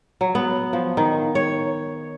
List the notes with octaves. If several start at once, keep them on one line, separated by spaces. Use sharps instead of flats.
F#3
B3
F3
D#3
C#5